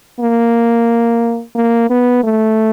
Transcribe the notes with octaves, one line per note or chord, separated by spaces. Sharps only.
A#3
A#3
B3
A3